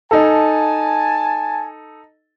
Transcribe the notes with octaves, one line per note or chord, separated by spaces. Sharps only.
D#4 A4 G#5 A5